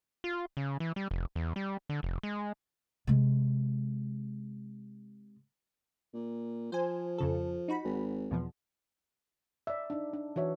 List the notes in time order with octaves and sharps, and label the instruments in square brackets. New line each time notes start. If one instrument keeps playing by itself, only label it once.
[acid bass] F4
C#3
E3
G3
F1
E2
G3
D3
F1
G#3
[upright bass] C3 G#3
[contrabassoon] A#2
[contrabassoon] F3 [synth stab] C5 G#5
[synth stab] F2 C#3 A4
D#4 F#4 B5
[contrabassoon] G#1
[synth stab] E2 B2 F3
[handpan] D5 E5
D4 D#4
D4
E3 F#4 C#5 E5